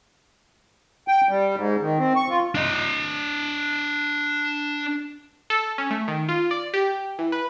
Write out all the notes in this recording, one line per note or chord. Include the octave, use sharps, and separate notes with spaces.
G5
G3
G#2
D#3
C4
C#6
F4
D4 D#5
A4
C#4
A3
D#3
F4
D5
G4
E3
B4